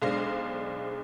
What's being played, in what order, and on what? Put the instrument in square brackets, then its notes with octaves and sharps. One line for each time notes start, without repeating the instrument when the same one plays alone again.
[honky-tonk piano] B1 G#3 D4 C5 F5 A#6